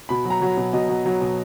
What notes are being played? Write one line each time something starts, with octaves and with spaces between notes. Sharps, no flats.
B2 B5
F#3
A#5
F#3
B2
B2 D#5
F#3
F#3
B2